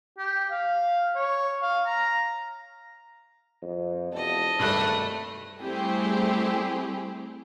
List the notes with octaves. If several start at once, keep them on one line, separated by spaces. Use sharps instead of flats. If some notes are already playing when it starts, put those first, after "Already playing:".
G4
F5
C#5
F5
A#5
F2
E1 A4 D#5
G#1 G2 A3 F#6
G3 A3 C4 E4 G4 G#4